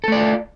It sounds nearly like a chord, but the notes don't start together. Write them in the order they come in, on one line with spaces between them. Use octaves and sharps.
A4 A3 D5 F4